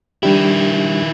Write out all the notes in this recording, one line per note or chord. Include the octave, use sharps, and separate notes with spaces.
D#3 G3 D4 E4 G4